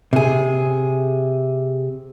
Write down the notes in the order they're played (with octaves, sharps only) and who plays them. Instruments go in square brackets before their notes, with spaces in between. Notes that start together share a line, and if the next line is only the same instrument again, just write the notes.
[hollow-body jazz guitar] C3 G#4